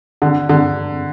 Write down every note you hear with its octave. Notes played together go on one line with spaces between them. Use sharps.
D3
D3